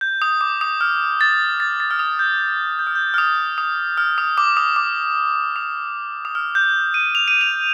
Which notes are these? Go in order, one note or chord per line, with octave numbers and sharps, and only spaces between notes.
G6
D#6
D6
D#6
F6
A6
A6
A6
F6
D#6
G6
G6
F6
G6
F6
D#6
D#6
F6
D#6
D6
D#6
D6
D#6
D#6
F6
G6
D#7
F7
D#7
F7